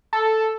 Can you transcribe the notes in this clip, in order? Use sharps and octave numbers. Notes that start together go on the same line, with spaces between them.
A4